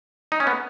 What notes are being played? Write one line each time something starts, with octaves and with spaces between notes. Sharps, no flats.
D#4
C#4
B3